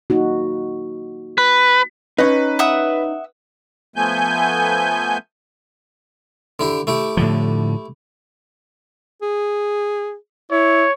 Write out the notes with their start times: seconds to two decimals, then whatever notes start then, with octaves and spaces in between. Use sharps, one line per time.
0.10 A#3 D#4 F#4
1.38 B4
2.18 C#4 D#4 B4
2.59 E5 F#5 D#6
3.96 F3 A3 B3 G#5 G6
6.59 D3 E4 G4
6.87 A3 E4 G4
7.17 A2 D3 F3
9.22 G#4
10.51 E4 C#5